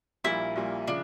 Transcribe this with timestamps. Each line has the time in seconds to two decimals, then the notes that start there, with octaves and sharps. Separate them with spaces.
0.24 A#1 A#2 G3 A#3 E4
0.56 A#1 A#2 G3 A#3
0.88 C#3 F3 D4